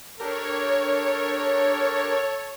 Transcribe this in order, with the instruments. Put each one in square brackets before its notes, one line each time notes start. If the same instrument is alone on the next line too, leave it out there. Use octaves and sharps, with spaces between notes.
[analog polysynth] D4 G4 A#4 [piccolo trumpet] A4 [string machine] C#5